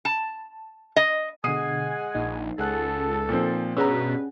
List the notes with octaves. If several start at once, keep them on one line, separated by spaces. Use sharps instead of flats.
A5
D#5
B2 D3 G#3 F#5 G#5 D#6 C7 D#7
A#1 D#4
C#2 G#4 A4 F#5 F#6
A#2 F3 C4
G2 B2 C#4 G#4 B4 F#5 A#5 E6